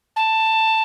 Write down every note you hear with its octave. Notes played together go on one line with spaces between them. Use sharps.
A5